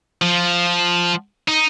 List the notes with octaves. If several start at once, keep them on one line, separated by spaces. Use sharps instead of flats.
F3
D#4